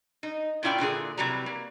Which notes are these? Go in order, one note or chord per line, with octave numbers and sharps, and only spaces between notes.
D#4
A#2 C#4 E4 F4 D5 G5
A#2 D3 E3 G#4
C3 E3 F#3 G3 B4 A#5
A#3